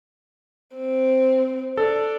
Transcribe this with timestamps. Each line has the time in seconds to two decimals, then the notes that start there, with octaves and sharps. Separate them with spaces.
0.76 C4
1.77 D4 A4